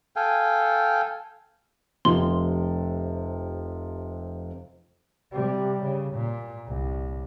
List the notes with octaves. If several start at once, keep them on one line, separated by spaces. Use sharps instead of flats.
A4 F5 G5 G#5
F1 C3 F3 C6
C3 G3
C#3
A#2
C2